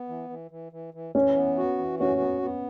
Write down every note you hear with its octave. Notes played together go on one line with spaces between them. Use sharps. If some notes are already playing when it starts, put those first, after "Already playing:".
Already playing: B3
E3
E3
E3
E3
E3
E3 C#4
B3
F#4
E3
C#4 F#4
B3
B3